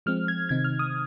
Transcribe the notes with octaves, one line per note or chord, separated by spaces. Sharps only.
F3 G#3 C4 F6
G#6
C3 D#3 C4 D#4 G#6
F6
D#6